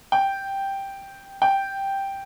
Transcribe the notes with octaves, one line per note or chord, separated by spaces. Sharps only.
G5
G5